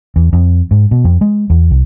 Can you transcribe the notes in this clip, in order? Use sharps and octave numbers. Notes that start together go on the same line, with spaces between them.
E2
F2
G#2
B2
F2
G#3
E2
C2